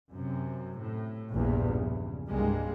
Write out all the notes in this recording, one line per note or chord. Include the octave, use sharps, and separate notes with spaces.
F#2 C3
A2
A#1 E2 G2 A#2
C#3
C2 G2 G3 G#3 A#3